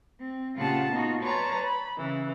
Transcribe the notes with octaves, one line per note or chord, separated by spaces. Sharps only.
C4
A#2 C#3 F4 G4 F#5 A5
B3 D#4 F4 F#4
B4 C#5 D5 A5 A#5 C6
B5
C#3 E3